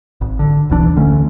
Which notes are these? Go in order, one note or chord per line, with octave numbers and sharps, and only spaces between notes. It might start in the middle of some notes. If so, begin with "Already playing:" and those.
G#1
D3
D#1 B1 E3 D4
D2 D3 A3 C#4